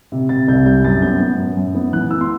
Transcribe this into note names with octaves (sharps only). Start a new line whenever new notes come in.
C3
C3 A6
C2 G6
G3 G6
F#2 A6
B3 G6
B3
F#2
F#2
B3
E3 F#6
B3 E6
C6